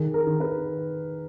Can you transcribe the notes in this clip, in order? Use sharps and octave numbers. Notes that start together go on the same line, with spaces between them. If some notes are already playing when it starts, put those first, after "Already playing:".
Already playing: D#3 G#4
A#4
D#3
B4